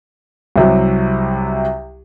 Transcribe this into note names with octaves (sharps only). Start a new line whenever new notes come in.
C2 C3 F#3